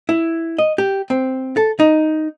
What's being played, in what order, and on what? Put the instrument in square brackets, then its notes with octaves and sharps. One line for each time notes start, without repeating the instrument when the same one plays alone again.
[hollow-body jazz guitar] E4
D#5
G4
C4
A4
D#4